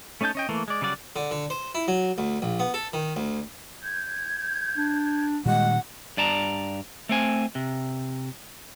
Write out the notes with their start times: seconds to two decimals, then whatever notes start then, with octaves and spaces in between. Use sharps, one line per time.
0.21 A3 C#4 D#4 A5 G6
0.35 C#4 D#5 G5
0.49 E3 A3 A#3
0.68 G#3 D5
0.82 C#3 F#3 G3 D5 F#5
1.16 D3
1.31 D3
1.50 C5
1.75 E4
1.88 F#3
2.18 D2
2.42 A#1
2.60 B3
2.74 A4
2.93 D#3
3.16 D2
3.82 G6 G#6
4.77 D4
5.46 A#2 D#3 G3 G#3 F#5
6.17 G2 D5 A5 A#5
7.09 A3 C4 G#5
7.55 C3